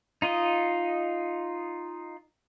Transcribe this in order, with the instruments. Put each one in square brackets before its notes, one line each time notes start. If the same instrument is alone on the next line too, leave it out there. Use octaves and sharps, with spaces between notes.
[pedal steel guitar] D#4 F4 D#5